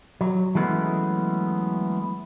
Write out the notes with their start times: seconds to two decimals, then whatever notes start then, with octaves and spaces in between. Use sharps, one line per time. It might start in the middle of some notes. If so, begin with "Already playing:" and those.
0.21 F#3
0.55 E3 F#3 G#3 A3 B3 C#4